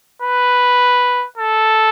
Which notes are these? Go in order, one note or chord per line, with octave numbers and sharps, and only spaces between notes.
B4
A4